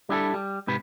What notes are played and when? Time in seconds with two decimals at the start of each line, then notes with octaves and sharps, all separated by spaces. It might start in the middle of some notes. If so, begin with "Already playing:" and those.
0.09 G3 D4 E4 G#4 A4
0.34 G3
0.67 G#2 C3 B4